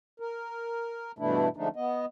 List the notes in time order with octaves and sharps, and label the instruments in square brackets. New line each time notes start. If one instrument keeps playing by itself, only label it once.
[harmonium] A#4
G2 B2 E3 A3 D4 E4
D3 F3 G#3 A3 D4 D#4
B3 D#5